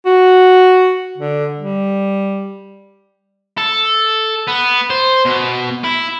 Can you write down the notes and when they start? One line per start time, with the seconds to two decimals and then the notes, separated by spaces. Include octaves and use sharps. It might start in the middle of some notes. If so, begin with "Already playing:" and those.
0.06 F#4
1.18 D3
1.58 G3
3.58 A4
4.48 B3
4.90 C5
5.25 B2
5.84 E4